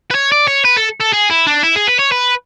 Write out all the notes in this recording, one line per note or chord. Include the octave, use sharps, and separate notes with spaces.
B4
C#5
D5
C#5
B4
A4
A4
G#4
E4
D4
E4
G#4
B4
C#5
B4